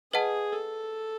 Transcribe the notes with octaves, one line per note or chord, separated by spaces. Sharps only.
G#4 B4 D#5 F#5 A5
A4